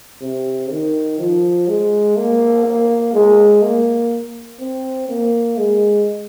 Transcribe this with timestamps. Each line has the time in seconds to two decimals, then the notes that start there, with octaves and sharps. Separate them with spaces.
0.22 C3
0.71 D#3
1.19 F3
1.68 G#3
2.17 A#3
2.65 A#3
3.14 G#3
3.62 A#3
4.60 C4
5.09 A#3
5.57 G#3